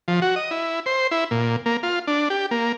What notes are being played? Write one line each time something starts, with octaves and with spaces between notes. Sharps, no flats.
F3
F#4
D#5
E4
C5
E4
A#2
A#3
F4
D4
G4
A#3